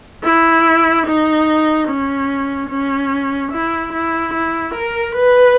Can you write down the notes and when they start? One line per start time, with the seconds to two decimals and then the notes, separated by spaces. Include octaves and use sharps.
0.24 E4
1.07 D#4
1.89 C#4
2.70 C#4
3.52 E4
3.93 E4
4.34 E4
4.75 A#4
5.16 B4